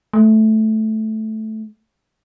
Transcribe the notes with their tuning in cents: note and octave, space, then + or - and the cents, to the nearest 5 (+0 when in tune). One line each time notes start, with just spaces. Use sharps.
A3 -10